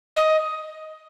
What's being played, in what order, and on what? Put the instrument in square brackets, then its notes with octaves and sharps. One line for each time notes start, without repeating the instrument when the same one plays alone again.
[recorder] D#5